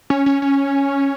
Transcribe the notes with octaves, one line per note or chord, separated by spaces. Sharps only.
C#4
C#4
C#4